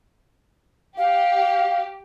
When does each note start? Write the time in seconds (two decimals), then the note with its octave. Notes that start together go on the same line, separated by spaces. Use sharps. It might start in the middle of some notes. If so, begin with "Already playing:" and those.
0.97 G4 F5